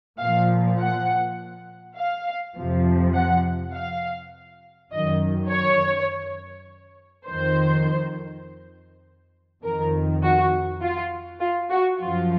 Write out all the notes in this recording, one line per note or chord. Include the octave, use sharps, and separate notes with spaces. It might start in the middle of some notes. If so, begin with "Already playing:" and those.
A#2 F3 F5
F#5
F5
F2 C3 F3
F#5
F5
F#2 D#3 D#5
C#5
F2 D#3 C5
F2 D#3 A#4
F#4
F4
F4
F#4
F#2 F3 F4